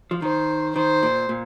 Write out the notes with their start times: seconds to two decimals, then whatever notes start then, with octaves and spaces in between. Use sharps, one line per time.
0.11 F3
0.22 D#3 C5
0.76 D#3 C5
1.03 A#2
1.29 A#2